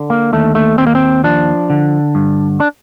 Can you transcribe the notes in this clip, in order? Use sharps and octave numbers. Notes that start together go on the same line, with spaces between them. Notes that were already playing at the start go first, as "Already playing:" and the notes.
Already playing: D3
A#3
D#2 A3
A3
D#2 C4
A#3
C4
F3 D4
D3
G2
D4